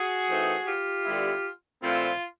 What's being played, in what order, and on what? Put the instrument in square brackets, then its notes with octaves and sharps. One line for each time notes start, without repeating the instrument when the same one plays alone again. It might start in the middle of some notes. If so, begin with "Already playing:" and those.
Already playing: [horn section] F#4 G#4
E3 A3 C4 D#4
F4 G4
D3 G3 B3 E4
A#2 F3 A3 C4 E4 F4